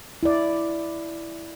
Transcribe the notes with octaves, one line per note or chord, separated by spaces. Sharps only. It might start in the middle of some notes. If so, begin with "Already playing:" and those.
E4 D5